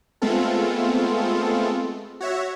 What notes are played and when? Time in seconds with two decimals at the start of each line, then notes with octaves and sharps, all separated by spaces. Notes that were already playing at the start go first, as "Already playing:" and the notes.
0.22 G#3 A3 B3 C4 F4 A4
2.21 F#4 C#5 E5